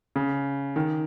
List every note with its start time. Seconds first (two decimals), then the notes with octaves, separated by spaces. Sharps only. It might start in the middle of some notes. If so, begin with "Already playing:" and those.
0.16 C#3
0.76 D#3